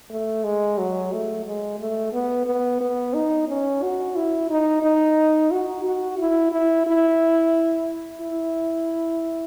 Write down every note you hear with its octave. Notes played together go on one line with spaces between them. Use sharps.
A3
G#3
F#3
A3
G#3
A3
B3
B3
B3
D#4
C#4
F#4
E4
D#4
D#4
F#4
F#4
E4
E4
E4
E4